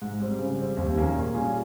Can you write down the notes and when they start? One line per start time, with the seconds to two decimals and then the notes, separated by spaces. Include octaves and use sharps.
0.02 G#2
0.20 G3 C4
0.39 C#3
0.58 G3 C4
0.77 D#2
0.95 D#3 A#3 C#4 G#4
1.15 A#2
1.34 G3 C#4 F4 G#4